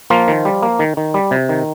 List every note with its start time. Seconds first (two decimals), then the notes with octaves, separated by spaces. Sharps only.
0.10 F3 A#3 F4
0.28 D#3
0.45 G3
0.63 A#3
0.79 D#3
0.97 D#3
1.14 G3
1.31 C3
1.49 D#3